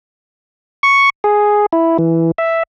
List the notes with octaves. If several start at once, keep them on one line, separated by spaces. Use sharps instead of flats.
C#6
G#4
E4
E3
E5